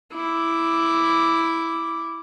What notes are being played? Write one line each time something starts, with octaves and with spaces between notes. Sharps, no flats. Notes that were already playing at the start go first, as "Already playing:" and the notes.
E4 D6